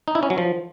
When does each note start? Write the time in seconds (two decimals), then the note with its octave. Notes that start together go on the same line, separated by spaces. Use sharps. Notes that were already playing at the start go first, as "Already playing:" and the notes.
0.08 D#4
0.15 E4
0.23 C#4
0.30 F#3
0.38 F3